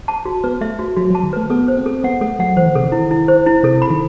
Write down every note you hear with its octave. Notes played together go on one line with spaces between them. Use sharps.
A5
F#4
B3 B4
A3 E5
F#4
F#3 F#4
F#3
A5
D#3
A3 B4
B3 A4
C5
C4
A4
B3 F#5
A3 A4
F#3 F#5
E3 C5
D#3
C3 A4
D#3
E4
E4
C5
E4
C3 A4
B5
D#3